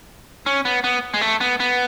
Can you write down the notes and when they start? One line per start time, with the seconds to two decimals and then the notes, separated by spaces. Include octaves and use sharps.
0.46 C#4
0.65 B3
0.84 B3
1.14 G#3
1.21 A3
1.41 B3
1.60 B3